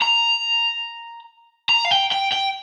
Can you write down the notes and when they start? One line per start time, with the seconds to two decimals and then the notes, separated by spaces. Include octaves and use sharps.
0.01 A#5
1.69 A#5
1.85 F5
1.92 G5
2.12 G5
2.33 G5